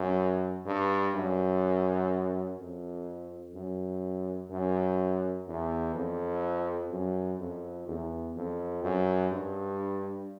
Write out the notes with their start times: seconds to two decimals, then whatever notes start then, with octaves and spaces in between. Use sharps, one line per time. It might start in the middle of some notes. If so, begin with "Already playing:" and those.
Already playing: F#2
0.66 G2
1.15 F#2
2.59 F2
3.54 F#2
4.50 F#2
5.48 E2
5.95 F2
6.91 F#2
7.39 F2
7.87 E2
8.36 F2
8.84 F#2
9.32 G2